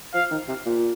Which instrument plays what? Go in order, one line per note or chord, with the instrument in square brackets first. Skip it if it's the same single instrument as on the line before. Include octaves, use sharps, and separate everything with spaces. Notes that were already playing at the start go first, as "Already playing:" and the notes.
[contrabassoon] F3 [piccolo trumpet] F5
[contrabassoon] D#3
C3
A#2